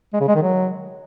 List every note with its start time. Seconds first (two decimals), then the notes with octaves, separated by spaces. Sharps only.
0.13 G#3
0.20 C#3
0.28 G#3
0.35 D#3
0.42 F#3